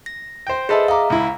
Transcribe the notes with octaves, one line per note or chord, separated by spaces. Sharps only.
A#6
C5 G5
G#4 A4 B4 C5 D#5 E5
D#5 F5 A#5 D6
C#2 E4